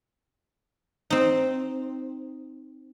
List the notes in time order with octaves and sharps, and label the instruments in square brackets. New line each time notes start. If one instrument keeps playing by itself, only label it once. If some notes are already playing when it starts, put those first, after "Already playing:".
[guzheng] C4 D#4